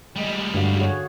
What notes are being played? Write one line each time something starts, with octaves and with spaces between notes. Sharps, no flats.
G3 G#3
G2 D3 F#4 F5
F#4 G#4 C#5